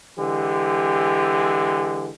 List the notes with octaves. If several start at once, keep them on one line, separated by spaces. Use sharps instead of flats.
D3 E3 G#3 G4